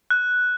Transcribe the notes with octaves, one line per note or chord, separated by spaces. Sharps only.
F#6